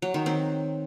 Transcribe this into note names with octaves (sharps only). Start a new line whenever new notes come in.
F#3
D#3
C4